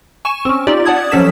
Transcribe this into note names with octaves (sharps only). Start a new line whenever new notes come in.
G#5 C#6 E7
C4 C#4
D#4 F4 G4 D5
D5 F#5 A5 D#6 G#6
F3 F#3 C#4 A4 B6 E7